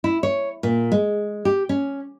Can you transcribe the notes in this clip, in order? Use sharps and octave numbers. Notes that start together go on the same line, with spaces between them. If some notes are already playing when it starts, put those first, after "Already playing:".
E4
C#5
A#2
G#3
G4
C#4